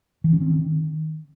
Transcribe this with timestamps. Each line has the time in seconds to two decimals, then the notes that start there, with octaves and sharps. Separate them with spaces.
0.24 E3
0.33 C#4
0.41 C4
0.50 D#3